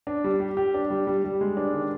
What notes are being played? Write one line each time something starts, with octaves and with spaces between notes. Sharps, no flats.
D4
G3
G4
G4
D4
G3
G3
G3
G#3
D4
D#3